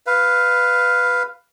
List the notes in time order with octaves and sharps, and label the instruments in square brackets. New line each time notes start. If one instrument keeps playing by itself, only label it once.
[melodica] B4 F5